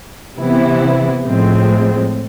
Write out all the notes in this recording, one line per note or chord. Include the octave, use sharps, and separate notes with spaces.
C3 E3 B3 E4
A2 F3 G#3 C4